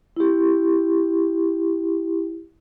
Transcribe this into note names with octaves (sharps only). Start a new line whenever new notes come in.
E4 G4